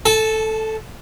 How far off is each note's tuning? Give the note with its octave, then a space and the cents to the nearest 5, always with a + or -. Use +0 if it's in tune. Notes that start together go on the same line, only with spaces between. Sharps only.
A4 +0 A5 -30